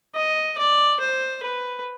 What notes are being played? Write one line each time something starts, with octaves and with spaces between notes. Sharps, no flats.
D#5
D5
C5
B4